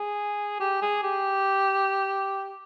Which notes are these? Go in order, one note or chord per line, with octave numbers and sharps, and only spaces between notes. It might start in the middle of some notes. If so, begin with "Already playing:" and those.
Already playing: G#4
G4
G#4
G4